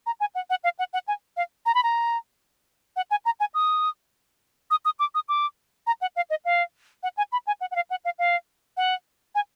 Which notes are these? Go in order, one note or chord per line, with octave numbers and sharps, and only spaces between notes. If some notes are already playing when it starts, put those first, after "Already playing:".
A#5
G#5
F#5
F#5
F5
F#5
F#5
G#5
F5
A#5
B5
A#5
F#5
G#5
A#5
G#5
D#6
D#6
D#6
D6
D#6
D6
A#5
F#5
F5
D#5
F5
F#5
G#5
B5
G#5
F#5
F#5
F5
F#5
F5
F5
F#5
G#5